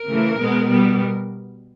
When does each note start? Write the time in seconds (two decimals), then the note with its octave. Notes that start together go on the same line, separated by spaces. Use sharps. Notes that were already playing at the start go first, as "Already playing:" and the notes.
Already playing: A#4
0.08 C#3 E3 A3
0.39 B2 G#3 B3
0.70 B2 G3 B3